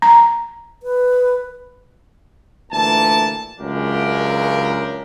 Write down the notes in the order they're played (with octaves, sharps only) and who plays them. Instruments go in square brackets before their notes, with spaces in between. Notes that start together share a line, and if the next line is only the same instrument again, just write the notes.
[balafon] A#5
[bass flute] B4
[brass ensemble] D2 A#2 E3 A5
C#2 F#2 C#3 D4 G4 A#4